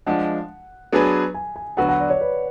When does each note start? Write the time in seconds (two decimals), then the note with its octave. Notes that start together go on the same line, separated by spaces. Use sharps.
0.06 F3 G#3 D4 F#5
0.93 F#3 B3 D4 G#4 B4
1.34 G#5
1.56 G#5
1.77 D3 F#3 B3 F#4 B4 F#5
1.89 F#5
2.00 D5
2.10 C#5
2.21 B4